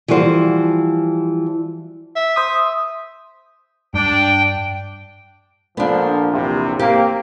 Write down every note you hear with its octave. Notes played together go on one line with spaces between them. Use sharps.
E3 F3 G3 F#4 C5
E5
C5 D#6
G2 D4 G5
A#2 D3 F3 B3 D4
A#1 E2 C3
A#3 C4 G4